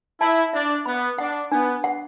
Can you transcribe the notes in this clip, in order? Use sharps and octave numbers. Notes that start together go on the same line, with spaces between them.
E4 A5
D4 E5
B3 B5
D4 F#5
B3 D4
F#5